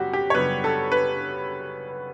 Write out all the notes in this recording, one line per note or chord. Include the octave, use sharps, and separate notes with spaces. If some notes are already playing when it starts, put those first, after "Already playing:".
Already playing: F#2 C#3 G3 B3 F#4 G4
G4
C#5
F#2 C#3 G3 B3 B4
A4
B4